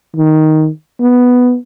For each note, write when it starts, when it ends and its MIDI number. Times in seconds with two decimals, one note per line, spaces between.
0.16 0.69 51
1.01 1.57 59